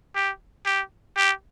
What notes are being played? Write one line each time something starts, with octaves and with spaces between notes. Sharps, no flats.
G4
G4
G4